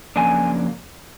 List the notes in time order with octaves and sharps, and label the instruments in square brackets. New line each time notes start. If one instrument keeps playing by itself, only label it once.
[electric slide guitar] F2 C#3 F#3 A#3 D4 G#5